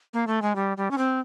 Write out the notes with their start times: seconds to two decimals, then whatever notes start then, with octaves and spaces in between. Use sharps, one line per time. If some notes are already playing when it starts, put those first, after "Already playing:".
0.13 A#3
0.27 A3
0.42 G#3
0.55 G3
0.77 G3
0.91 C#4
0.98 C4